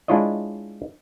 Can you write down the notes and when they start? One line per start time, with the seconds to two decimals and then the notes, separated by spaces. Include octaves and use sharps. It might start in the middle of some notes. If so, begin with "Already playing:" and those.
0.08 G#3 D4 E4 F4 C#5 D#5